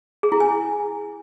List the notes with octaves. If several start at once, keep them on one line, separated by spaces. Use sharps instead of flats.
G#4
E4
G#5